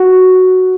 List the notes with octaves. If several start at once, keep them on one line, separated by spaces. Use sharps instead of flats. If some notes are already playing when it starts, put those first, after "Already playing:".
Already playing: F#4